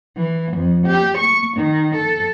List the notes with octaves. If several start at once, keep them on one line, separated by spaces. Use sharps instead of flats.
E3
F2
G4
C#6
D#3
A4